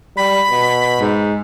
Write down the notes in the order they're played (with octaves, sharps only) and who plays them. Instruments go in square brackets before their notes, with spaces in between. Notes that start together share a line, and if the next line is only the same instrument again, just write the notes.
[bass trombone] G3 [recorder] B5
[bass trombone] B2
[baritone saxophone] G#2